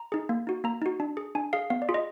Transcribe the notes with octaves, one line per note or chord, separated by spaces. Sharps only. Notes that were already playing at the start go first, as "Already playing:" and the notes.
Already playing: A#5
D#4 G#4
A#3
D#4 F#4
A#3 A#5
D#4 F#4
D4
G#4
D4 G#5
G#4 F5
B3 F5
D5
F4 G#4
D#5